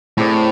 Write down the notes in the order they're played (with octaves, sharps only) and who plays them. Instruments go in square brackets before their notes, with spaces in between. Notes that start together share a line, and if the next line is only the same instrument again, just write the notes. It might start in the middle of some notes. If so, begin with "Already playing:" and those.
[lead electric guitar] A2 [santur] C4 G#4 D5